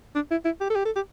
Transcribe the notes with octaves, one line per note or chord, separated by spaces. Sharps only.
D4
E4
E4
G4
A4
G4
A4
G4